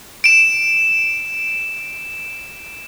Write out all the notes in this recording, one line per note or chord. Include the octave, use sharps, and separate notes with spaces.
D7 E7